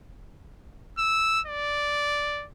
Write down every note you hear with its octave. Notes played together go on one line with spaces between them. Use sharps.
E6
D5